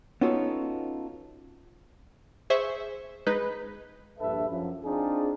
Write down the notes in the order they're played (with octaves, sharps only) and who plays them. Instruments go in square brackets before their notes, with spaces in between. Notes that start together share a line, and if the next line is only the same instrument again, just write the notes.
[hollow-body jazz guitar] B3 C#4 D#4 F4 F#4 A4
[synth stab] G#4 C5 E5 C#6
G#3 D#4 B4
[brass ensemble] A#1 G2 A4 B4 E5
F#2 F3
C4 D4 D#4 F4 G#4